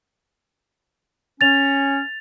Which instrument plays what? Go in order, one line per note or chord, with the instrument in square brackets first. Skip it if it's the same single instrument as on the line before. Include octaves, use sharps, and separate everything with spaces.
[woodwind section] C#4 [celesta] A6 F7